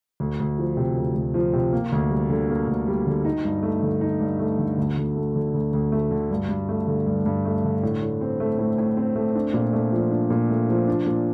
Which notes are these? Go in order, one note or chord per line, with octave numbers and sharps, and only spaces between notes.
D2
D2
F3
C3
D2
D2
F3
C3
A#3
D2
G3
D3
A#3
D2
G3
D3
D#4
G2
A3
D3
D#4
G2
A3
D3
D2
D2
A3
D3
D2
D2
A3
D3
G2
G2
A3
D3
G2
G2
A3
D3
A2
A2
C4
A3
A2
A2
C4
A3
D4
A#2
A3
F3
D4
A#2
A3
F3
D4
A#2